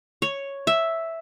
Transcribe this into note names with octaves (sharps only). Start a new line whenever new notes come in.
C#5
E5